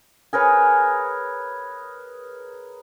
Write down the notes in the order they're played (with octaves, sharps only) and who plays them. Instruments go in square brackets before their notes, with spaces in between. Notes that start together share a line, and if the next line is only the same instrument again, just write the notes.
[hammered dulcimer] G#4 A#4 B4 C#5